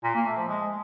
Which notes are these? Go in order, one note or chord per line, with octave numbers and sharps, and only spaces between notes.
A#2
A#3
A3
F3
G#3